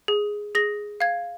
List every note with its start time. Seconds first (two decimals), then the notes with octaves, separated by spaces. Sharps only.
0.08 G#4
0.55 G#4 A#6
1.00 F5 G#6